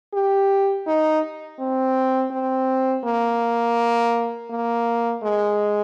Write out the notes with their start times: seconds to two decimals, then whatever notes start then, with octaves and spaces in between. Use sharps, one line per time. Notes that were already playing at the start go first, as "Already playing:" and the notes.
0.13 G4
0.87 D#4
1.59 C4
2.31 C4
3.05 A#3
4.50 A#3
5.23 G#3